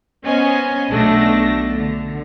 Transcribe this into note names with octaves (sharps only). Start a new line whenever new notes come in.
B3 C#4 C5 D#5 G#5
B1 B2 A3 D4 A#6
D3